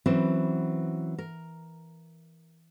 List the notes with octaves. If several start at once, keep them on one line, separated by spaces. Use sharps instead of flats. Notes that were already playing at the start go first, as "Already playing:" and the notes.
E3 F#3 C4 C#4 B4
A#4